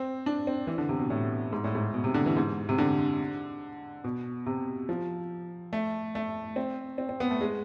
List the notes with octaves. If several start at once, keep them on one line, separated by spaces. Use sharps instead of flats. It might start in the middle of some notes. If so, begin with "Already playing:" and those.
Already playing: C4
D4
C4
E3
D3
C3
B2
A2
G#2
A2
G#2
B2
C3
D3
E3
G#2
C3
D3
B2
C3
F3
A3
A3
C4
C4
C4
B3
A3
G#3